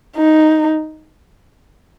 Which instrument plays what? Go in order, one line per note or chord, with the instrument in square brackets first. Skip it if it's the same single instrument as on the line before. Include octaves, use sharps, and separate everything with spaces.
[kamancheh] D#4